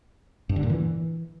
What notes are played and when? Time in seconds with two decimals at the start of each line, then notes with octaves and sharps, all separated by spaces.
0.49 G2
0.56 D3
0.63 A#2
0.70 E3